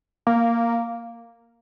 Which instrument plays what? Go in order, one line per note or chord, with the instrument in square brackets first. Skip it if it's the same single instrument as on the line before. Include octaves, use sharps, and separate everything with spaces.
[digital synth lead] A#3